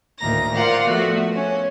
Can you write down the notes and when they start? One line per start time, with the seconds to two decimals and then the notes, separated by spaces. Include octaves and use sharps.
0.19 D2 A2 D#3 A#3 A#5 A#6
0.53 F4 A#4 C5 D5 F5 F#5
0.86 F3 A3 B3 F#4
1.35 C#4